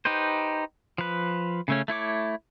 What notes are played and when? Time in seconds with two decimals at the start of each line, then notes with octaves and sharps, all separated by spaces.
0.05 D#4 G4 B4 C5
0.98 F3 B4
1.68 C#3 A3 C#4
1.88 A3 E4 C#5 D6